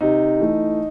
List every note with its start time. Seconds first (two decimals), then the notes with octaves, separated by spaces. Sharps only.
0.01 C3 D#4
0.39 E3 A3